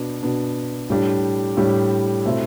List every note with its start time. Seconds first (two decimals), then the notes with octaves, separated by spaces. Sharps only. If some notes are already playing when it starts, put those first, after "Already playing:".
Already playing: B2 B3 D4
0.23 B2 B3 D4
0.90 A2 G3 D4 G4
1.57 A2 G3 D4 G4
2.25 B2 A3 C4 E4